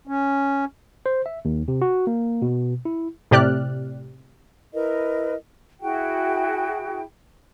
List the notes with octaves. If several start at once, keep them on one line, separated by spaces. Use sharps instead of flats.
C#4
C5
E5
D#2
C3
F#4
A#3
B2
E4
A2 C3 G4 D5 F6 F#6
E4 A#4 B4 D#5
E4 F#4 G#4 G5